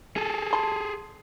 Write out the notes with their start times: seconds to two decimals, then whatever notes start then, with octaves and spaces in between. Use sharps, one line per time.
0.16 G#4 A4
0.53 A5 C6